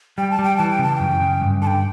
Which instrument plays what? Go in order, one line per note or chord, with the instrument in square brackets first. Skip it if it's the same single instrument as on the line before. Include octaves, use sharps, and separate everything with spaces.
[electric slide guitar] G3 [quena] G5
[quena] A5
[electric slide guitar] G3
[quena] G5
[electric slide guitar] E3 [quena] A5
[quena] G5
[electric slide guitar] C#3 [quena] A5
[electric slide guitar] F#2 [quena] G5
[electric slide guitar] C#3
G2
[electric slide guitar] D3 [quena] A5
[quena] G5